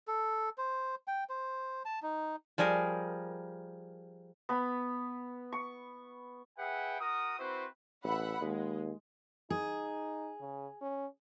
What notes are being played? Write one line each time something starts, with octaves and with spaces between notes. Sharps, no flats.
A4
C5
G5
C5
A5
D#4
F3 G3 G#4 A#4
B3 B5
C#6
G#4 B4 E5 F#5 G5
F#4 A#4 D#6
C4 E4 F#4 B4 C5
A1 E5 F#5 B5
D#2 G#3
D#4 G#4
C#3
C#4